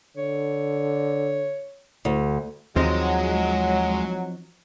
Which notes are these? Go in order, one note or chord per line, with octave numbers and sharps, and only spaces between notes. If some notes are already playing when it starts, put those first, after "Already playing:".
D3 C#5
D2
D#2 F3 F#3 G#3 C4 D#4